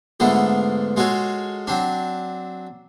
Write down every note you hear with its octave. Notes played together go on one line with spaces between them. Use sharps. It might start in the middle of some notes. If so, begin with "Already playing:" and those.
G#2 D3 A3 B3 F4
G#3 F4 F#4 A4 C#5
F#3 C4 D4